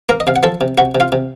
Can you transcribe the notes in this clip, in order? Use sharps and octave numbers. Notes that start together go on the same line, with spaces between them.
A#3 A#4 A#5
D#5
C3 F5
F#5
F3 A4 A5
C3
C3 F#4 F#5
C3
F4 F5
C3